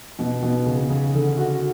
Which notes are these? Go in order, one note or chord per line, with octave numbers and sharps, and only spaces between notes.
B2
B2
C#3
C#3
D3
F#4